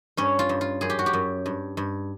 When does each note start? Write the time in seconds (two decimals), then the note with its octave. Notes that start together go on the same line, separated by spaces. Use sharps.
0.17 G2 C#4
0.39 F4
0.49 G2
0.61 F4
0.81 F#2 G#4
0.90 G4
0.99 F#4
1.06 G4
1.13 F#2
1.46 G2
1.77 G2